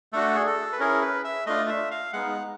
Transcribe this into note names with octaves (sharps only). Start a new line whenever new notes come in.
A3 D4 F#4 A4
G#4
A4
B4
C#4 E4 G#4 A#4
B4
E5
A3 D4 F4 D#5
E5
F5
G#3 B3 D#4 F#5